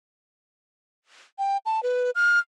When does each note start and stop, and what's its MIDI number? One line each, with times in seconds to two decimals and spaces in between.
1.39 1.57 79
1.66 1.83 81
1.83 2.11 71
2.15 2.39 89